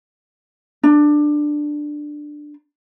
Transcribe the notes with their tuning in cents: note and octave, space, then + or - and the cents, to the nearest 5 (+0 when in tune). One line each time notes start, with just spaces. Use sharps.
D4 +10